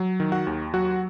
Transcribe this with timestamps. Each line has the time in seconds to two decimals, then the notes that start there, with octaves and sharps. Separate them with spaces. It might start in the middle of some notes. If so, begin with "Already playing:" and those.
Already playing: F#3
0.20 D#3
0.32 F#4 F#5
0.47 D#2
0.74 F#3 F#4 F#5